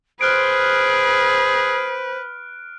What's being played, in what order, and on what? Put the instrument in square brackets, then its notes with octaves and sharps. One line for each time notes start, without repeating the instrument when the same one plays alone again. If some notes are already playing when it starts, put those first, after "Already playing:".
[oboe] G#4 [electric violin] B4 [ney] C5 [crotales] F6 F#6 D7